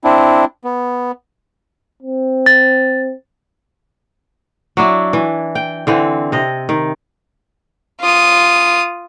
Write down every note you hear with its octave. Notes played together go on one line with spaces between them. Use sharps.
C4 D4 E4
B3
C4
A6
F#3 D4 E4
E3
G5
D3 E3 C4
C3 D#5
D#3
F4 D#6